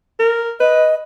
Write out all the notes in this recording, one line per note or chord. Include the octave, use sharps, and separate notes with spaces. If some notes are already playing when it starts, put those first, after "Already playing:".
A#4
B4 D#5